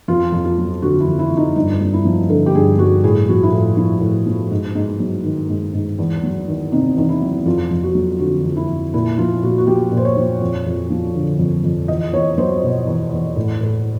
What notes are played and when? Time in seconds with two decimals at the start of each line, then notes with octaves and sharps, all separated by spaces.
0.08 F2 F4
0.32 F2
0.45 F4
0.58 F#3
0.82 D3 F#4
1.00 E4
1.07 F2
1.19 E4
1.31 F2
1.37 D#4
1.56 G2 D#4
1.81 G2
1.93 E4
2.05 F3
2.29 D3 A4
2.46 G4
2.55 G2 G#4
2.78 G2 F#4
3.04 A2 G#4
3.28 F3 F#4
3.43 E4
3.52 A2 F4
3.77 F3 E4
4.01 A2
4.26 F3
4.51 G#2
4.75 G#2
5.00 F#3
5.24 D#3
5.49 G#2
5.74 G#2
5.98 E2
6.23 F#3
6.47 D#3
6.72 C3 D#4
6.97 E2 D#4
7.09 E4
7.22 F#3
7.46 F2 F4
7.71 F2
7.83 F#4
7.95 F#3
8.19 D3 F#4
8.44 F2
8.57 E4
8.69 F2
8.94 A#2 E4
9.18 F3 F4
9.43 A#2 F#4
9.58 F#4
9.67 F3 G4
9.92 A#2
9.97 C5
10.05 C#5
10.17 F3
10.41 F2
10.66 F2
10.90 F3
11.15 D3
11.39 F2
11.64 F2
11.88 E2 D#5
12.13 E2 C#5
12.38 F#3 C5
12.62 B2
12.86 E2
13.12 E2
13.36 A2
13.61 A2